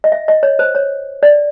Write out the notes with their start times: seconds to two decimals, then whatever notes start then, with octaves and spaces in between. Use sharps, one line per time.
0.04 D#5
0.12 E5
0.28 D#5
0.43 C#5
0.59 C5
0.75 C#5
1.23 D5